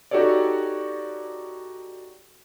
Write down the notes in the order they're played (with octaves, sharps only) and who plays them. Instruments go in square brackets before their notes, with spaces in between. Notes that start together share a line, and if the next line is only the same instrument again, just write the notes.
[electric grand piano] D#4 F#4 G4 A4 C#5 D5